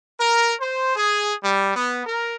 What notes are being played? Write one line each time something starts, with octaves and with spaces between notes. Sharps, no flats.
A#4
C5
G#4
G3
B3
A#4